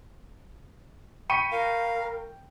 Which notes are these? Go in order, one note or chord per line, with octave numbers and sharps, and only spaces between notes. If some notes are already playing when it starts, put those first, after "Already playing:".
G5 B5 C#6 B6 C#7 D#7
A#4 F5